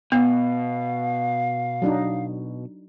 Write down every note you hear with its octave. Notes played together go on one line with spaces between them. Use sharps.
B2 B3 F5
F#3 D4 D#4